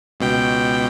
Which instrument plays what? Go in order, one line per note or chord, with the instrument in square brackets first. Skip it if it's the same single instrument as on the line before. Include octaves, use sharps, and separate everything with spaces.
[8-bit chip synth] C#2 B2 G5